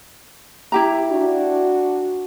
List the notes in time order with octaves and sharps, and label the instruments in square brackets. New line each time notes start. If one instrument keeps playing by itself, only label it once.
[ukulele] E4 G4 A#5
[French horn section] D4 F#4